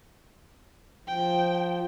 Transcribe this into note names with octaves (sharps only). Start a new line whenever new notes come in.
F3 G5